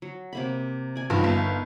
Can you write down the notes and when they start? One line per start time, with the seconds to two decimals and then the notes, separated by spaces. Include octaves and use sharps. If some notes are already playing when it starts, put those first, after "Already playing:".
0.02 F#3
0.33 C3 A#3 B5
0.96 D5 G#5
1.10 G2 F3 D#4 A#4 B4
1.24 G1